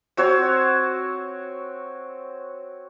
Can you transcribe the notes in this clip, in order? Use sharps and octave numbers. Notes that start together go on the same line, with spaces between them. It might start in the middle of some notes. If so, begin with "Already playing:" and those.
C4 F#4 C5 C#5